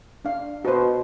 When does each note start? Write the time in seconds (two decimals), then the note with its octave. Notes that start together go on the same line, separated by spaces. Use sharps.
0.25 D4 F5
0.65 B2 F#4 C5